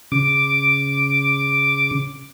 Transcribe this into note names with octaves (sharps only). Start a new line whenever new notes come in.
C#3 D6